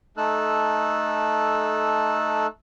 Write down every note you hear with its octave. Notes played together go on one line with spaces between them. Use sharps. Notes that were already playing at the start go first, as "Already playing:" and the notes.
A3 D#4 A4 E6 F#6